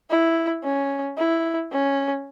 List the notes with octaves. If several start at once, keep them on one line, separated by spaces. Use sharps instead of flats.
E4
C#4
E4
C#4